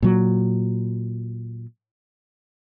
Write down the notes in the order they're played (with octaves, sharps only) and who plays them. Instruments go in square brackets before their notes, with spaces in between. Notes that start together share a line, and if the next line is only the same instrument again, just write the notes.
[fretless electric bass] A#2 F#3